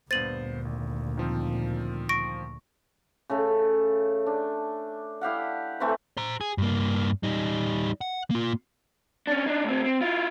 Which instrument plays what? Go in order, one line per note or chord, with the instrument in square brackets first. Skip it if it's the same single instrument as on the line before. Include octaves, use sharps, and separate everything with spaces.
[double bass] D2 A#2 [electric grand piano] G2 B3 C5 [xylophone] A6 D#7 F#7
[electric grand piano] G#1
D#3 F3 C4
[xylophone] C#6 A#6 D7
[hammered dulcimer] C#3 A3 A4
D4
E4 G4 F5 F#5
E3 A3 C4 B4
[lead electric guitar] C5 A#5
G#4
G2 A#3
G3 D#4
F#5
A#3 F4
C#4 D4
D4 D#4
A2 C4
C4
E4 F4